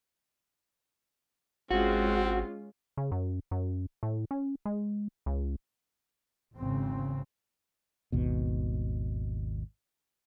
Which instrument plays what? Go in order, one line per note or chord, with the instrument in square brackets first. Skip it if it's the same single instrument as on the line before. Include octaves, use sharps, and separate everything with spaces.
[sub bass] G#1 [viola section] G#3 C#4 F4 [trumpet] C4 [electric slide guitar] F#4
[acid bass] C#3
F#2
F#2
A2
C#4
G#3
C#2
[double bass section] G#1 E2 G#2 C#3 C4
[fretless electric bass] G#1 D#2 B2